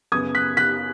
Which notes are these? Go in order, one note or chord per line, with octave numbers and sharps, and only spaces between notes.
F#2 C#3 B3 D#6 G#6
F#6 B6
F#6 B6